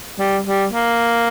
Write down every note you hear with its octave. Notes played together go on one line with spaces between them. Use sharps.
G3
G3
A#3